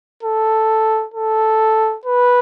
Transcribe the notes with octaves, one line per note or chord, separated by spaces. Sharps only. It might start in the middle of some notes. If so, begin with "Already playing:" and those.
A4
A4
B4